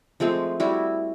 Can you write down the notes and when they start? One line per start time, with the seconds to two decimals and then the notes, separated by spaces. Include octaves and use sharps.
0.20 F3 G#3 A3 C4
0.60 G3 E4 F#4